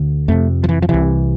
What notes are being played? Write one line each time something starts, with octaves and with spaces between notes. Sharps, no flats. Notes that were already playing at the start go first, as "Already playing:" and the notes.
Already playing: D2 D3
F2 C3 A3
F3
E3
F3
C2 C3 E3